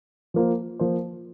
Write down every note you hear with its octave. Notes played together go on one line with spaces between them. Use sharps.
F3 A#3 F4 C5
F3 A#3 F4 C5